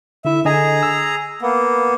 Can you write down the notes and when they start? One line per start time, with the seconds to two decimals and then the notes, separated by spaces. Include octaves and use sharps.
0.25 D3 E4 E5
0.46 D3 G#4 D#5 G#5 A#5
0.83 E6
1.42 A#3 B3